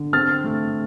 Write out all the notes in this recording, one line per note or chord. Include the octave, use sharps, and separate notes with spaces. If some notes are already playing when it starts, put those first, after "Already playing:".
Already playing: D3
C4 F6 A6
A3